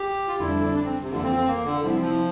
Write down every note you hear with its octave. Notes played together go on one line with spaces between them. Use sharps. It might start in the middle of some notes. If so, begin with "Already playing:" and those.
Already playing: G4
F4
F2 D3 G3 D4 E4 A4
D4
C4
C3
F2 D3 E3 A#3 F4 A4
C4
C4
A#3
D3
C3 F3 G3 C4 E4
F3